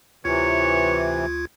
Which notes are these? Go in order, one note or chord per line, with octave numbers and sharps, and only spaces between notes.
D2 C3 E3 F4 C#5 G#6